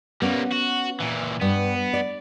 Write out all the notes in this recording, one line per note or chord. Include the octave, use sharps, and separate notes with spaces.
G3 A#3 B3 C#4
F#4
A#2 E3
G2 B3
D5